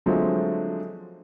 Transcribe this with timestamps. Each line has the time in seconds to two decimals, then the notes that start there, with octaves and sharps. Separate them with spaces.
0.06 D3 F3 F#3 G#3 A3 C4